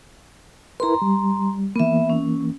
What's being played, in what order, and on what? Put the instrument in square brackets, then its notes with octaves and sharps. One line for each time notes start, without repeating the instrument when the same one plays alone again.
[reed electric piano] E4 A#4 B4 [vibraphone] A#5 C6
[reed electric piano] G3
[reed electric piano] E3 A#3 [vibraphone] B3 E5
[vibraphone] C#4